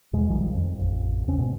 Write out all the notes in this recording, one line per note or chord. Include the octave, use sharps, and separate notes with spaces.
E2 B2 G#3
A#1 D#3 F3 G3
F2
A1 F2
D#2 C#3 C4 C#4
G#2 B2